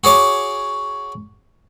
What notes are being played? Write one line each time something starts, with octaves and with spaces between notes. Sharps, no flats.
F#4 G#4 C#5 D6